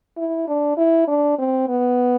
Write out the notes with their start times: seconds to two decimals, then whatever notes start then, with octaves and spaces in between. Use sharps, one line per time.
0.17 E4
0.48 D4
0.78 E4
1.08 D4
1.38 C4
1.68 B3